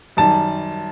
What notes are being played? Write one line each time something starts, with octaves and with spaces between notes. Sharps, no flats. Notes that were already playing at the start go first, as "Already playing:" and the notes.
F#2 D#3 G3 A5